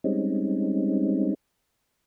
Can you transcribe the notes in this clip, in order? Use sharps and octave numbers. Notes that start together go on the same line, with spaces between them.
G3 G#3 C4 C#4 D#4